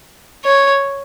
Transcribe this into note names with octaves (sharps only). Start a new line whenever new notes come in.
C#5